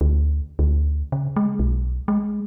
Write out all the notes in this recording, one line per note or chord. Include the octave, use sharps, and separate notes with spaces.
D2
D2
C#3
G#3
B1
G#3